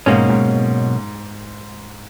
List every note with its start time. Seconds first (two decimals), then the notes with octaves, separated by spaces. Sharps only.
0.06 B1 G#2 B2 A#3 C#4
0.29 G#2